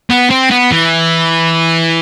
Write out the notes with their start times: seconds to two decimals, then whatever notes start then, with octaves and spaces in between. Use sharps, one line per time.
0.10 B3
0.31 C4
0.51 B3
0.72 E3